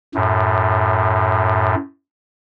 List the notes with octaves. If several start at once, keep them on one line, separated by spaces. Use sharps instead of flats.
F#2 A2